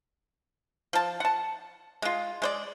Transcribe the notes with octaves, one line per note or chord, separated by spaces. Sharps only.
F3 A5
F#5 A5
G#3 F4
G#3 C5 D5